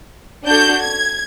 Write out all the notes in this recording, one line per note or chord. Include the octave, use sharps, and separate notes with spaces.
D4 F#4 A4 G6
G#6